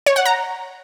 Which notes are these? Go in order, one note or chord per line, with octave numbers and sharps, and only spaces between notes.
C#5
F#5
A#5